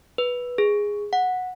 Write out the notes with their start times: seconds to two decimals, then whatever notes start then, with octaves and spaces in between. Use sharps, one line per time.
0.18 B4
0.58 G#4
1.13 F#5